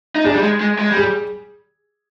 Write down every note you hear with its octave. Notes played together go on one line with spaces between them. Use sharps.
D#4
D4 G#4
G3
G#3
G#3
G#3
G3
G#4